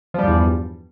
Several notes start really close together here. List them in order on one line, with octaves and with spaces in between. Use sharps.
F3 G3 G2 E2